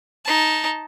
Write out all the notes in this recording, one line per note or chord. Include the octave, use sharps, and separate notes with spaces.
D#4 A5